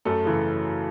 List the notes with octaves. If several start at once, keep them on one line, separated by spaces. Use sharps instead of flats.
F#2 A3 A4
C#3 E3